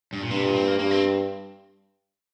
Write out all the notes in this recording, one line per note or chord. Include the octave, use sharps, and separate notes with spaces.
G2
A#2
G2 C3
A#2
C4
A#3
G2 A#3
C4